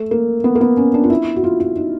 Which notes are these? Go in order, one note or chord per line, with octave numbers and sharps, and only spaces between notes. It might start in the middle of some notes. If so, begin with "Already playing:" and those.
Already playing: A3
A#3
B3
A#3
B3
C#4
D4
F4
E4
F#4
F4
E4
D#4